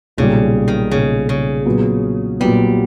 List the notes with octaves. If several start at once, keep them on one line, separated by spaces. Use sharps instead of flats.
B1 A#2 C#3 G3
D#3
B1 A#2 C#3 G3
C#3
A#2 F#3 B3
A#2 F#3 G3 B3